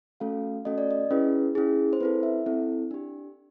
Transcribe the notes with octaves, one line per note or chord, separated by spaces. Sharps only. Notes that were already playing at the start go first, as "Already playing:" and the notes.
A3 C#4 F#4 A4 F5
A3 C#4 F#4 A4 D#5
D5
D#5
C#4 E4 G#4 B4
C#4 E4 G#4
C5
C4 E4 A4 B4
E5
C4 E4 A4
D4 G4